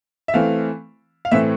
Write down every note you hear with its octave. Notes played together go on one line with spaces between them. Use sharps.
E5
E3 A3 C4 F5
F5
A2 E3 A3 C4 E5